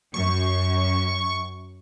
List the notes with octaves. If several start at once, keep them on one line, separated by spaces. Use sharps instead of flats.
F#2 C#6